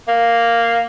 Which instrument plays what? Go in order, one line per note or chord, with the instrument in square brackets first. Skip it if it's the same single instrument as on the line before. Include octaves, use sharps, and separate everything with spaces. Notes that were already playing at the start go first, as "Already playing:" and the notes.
[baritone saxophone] A#3